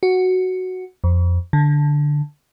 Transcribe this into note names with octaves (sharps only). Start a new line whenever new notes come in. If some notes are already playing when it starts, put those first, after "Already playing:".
F#4
F2
D3